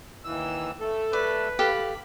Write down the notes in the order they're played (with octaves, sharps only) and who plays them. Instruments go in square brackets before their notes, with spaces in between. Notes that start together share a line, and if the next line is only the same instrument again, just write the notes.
[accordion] D#2 E3 E6
A3 A4
[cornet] B4 [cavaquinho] D5
[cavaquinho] G4 A4 F5 [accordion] B5